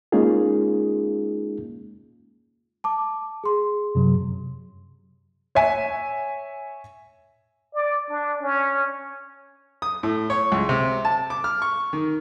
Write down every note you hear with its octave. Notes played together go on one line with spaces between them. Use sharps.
G#3 A#3 C#4 D#4 F4 G#4
A5 D6
G#4 C6
F#2 C3 F#3
C#5 E5 G#5
D5
D4
C#4
D#6
A2
C#5
C#2
C3
A5
D6
F6
C#6
D#3